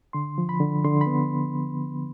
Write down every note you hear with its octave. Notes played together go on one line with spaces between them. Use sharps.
D3 C6
F3
B5
D3
D3 C6
B5
B3